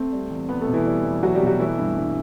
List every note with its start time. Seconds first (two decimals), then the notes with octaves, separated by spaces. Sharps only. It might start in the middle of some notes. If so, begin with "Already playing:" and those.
Already playing: A3 C4 C5
0.12 G3
0.31 E2
0.49 E2 B3 B4
0.61 A3 A4
0.67 B2
0.73 E3 E4
0.86 G3
1.05 E2
1.22 E2 F#3 F#4
1.35 G3 G4
1.41 B2
1.47 F#3 F#4
1.59 E3 A3 E4
1.78 G2
1.97 G2